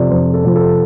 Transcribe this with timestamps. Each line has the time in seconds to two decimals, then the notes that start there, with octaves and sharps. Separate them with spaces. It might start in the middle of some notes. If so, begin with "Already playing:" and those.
Already playing: F2 C3 F3 A4 D5
0.10 F2 C5
0.33 A4
0.44 C3 F3
0.56 A4